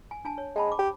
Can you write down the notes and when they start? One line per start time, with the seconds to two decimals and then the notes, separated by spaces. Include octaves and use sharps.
0.11 G#5
0.25 D4 G#5 A5
0.38 C#5
0.56 G#3 G5 A5 B5
0.67 C5 D6
0.79 G4